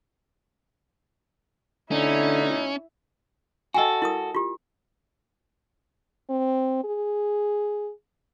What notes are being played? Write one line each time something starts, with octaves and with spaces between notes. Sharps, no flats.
B2 D3 A3 C#4 D#4 E4
F#4 A4 D#5 G5 G#5
E4 A#4 D#6
F4 G4
C4
G#4